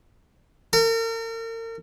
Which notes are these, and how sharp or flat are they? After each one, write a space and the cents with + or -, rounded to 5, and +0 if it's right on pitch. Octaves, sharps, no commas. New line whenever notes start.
A#4 -40